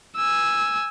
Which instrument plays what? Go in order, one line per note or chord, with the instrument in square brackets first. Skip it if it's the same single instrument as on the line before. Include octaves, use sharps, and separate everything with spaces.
[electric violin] G#5 E6